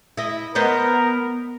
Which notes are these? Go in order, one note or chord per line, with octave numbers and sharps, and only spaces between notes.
E4 D#5
B3 A#4 C5 D#5